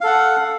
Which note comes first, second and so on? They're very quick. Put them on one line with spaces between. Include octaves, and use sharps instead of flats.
F5 A4 F#5